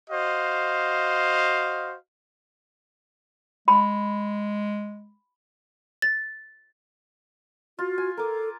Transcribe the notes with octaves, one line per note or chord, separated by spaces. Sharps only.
F#4 C5 D#5 F5
G#3 B5
A6
F4 F#4
G#5
A4 A#4 D6